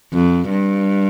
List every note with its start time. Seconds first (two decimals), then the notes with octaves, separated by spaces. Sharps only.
0.13 F2
0.50 G2